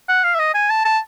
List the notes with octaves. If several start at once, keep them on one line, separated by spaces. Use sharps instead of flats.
F#5
F5
E5
D#5
G#5
A5
A5